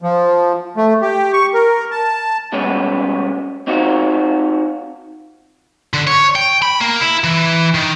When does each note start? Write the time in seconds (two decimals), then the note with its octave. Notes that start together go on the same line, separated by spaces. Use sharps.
0.02 F3
0.77 A3
1.02 G4
1.33 C#6
1.54 A#4
1.91 A5
2.52 B2 G3 G#3 B3 C#4
3.67 C4 D#4 F4 F#4
5.94 D3
6.07 C#5
6.36 G5
6.62 B5
6.81 A#3
7.01 E4
7.24 E3
7.75 D#3